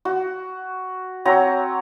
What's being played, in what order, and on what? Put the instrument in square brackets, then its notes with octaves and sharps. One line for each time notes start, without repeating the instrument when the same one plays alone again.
[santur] F#4
F#3 C4 C#5 A#5